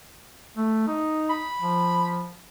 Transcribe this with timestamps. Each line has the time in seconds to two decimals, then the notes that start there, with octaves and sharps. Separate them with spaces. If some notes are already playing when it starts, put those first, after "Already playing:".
0.57 A3
0.87 D#4
1.29 B5
1.61 F3